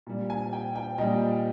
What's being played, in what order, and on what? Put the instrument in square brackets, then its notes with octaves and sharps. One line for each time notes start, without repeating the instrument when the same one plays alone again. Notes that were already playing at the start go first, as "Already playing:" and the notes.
[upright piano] A#2 G3
G#5
G5
G5
A#2 G3 D#5